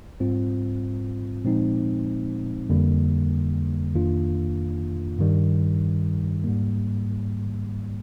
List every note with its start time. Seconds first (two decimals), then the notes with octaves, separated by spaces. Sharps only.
0.20 G#2 G3 C4 F4
1.45 A#2 F3 G#3 C4 D#4
2.70 F2 D3 G3 A#3
3.94 F2 D#3 A#3 D4 F4
5.19 G2 D#3 G3
6.44 G#2 G3 A#3